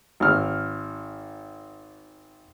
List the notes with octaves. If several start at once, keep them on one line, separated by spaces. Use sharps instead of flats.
G#1 F6